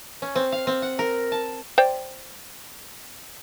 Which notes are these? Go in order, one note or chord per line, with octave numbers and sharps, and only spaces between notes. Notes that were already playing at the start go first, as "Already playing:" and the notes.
C#4
C4
F5
C4
F#5
A#4
A5
C5 D5 G5